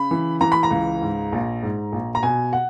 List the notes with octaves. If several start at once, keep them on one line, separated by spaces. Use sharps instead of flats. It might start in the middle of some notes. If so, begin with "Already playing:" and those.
Already playing: C#3 B5
E3
E3 A#5
B5
A#5
C#2
G#2
A#1
G#2
A#1
A#5
B2 G#5
F#5